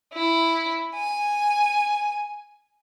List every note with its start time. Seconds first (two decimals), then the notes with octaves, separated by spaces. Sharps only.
0.13 E4
0.95 G#5